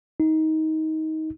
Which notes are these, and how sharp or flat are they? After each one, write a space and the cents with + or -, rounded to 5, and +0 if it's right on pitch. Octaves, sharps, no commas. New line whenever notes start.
D#4 +20